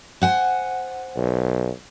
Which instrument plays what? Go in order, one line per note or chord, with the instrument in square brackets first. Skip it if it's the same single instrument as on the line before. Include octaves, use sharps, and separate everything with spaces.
[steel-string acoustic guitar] C5 F#5 G#5
[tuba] B1